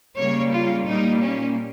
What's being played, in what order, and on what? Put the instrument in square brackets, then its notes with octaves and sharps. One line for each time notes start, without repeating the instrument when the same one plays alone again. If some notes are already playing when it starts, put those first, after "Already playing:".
[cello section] C#3 G3 A#3 C#5
F4
A#2 G3 A#3 D#4
C#4